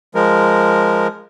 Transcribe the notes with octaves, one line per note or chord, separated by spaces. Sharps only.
F3 G#3 A#4